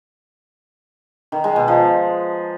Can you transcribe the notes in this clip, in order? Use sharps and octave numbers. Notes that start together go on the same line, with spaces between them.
D#3
G#3
B2
F3